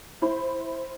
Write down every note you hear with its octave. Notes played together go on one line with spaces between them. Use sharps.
E4 C5 B5